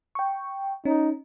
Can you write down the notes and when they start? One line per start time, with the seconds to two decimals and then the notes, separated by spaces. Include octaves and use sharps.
0.15 G5 C#6
0.85 C#4 D#4